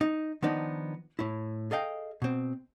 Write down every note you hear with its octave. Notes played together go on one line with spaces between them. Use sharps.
D#4
D#3 F3 B3 D4 D#4
A2 E4
G#4 A4 D#5 F5 G5
B2 C4